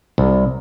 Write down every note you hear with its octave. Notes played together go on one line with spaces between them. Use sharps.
C2